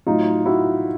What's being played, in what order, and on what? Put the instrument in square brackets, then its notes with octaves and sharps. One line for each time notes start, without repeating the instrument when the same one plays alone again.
[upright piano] A2 F#3 D#4 F4
E4 F#4